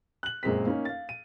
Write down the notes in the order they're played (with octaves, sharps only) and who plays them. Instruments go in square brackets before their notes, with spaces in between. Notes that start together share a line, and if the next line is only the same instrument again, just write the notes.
[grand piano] F#6 F#7
F#2 A#2 G#3 C4 B6
A#3 C#4 D#4
F5 A6
D#7